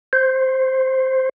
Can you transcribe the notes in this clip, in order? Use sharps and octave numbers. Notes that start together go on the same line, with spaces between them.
C5